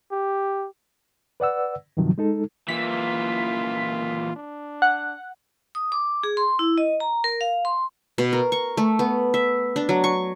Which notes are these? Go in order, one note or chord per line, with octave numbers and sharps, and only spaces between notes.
G4
B4 D5 F#5 E6
G2 C3 D#3 F3 F#3
G#3 D#4 A4
A#2 E3 F4 B6
D4
F#5
D#6
D6
G#4
C6
E4
D#5
A#5
A#4
F5
C6
B2
A#4
C#6
A3
B3
E5
D4
F#3
C#6